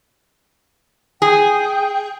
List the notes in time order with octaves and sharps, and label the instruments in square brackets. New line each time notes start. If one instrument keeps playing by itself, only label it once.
[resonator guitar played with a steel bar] G#4 [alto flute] G5